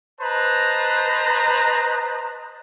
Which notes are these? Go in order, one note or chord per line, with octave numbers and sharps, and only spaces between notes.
B4 C5 D#5 A5 A#5